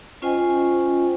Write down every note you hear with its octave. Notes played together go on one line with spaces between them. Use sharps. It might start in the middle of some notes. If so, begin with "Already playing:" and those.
C#4 F4 C5 D#5 G5 G#5